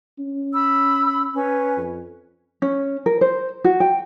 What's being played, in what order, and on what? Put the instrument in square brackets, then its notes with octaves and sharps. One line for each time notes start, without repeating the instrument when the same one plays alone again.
[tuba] C#4
[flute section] B5 E6
C#4 B4
[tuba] F2
[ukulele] C#4
A#4
C5
F#4
G5